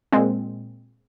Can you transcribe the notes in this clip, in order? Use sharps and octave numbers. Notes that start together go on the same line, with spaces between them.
A#2 G#3 C4